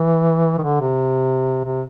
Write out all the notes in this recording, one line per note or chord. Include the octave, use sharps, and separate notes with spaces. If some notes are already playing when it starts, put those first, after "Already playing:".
Already playing: E3
D#3
D3
C3
C3